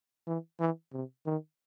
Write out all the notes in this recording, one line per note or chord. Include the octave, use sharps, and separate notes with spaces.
E3
E3
C3
D#3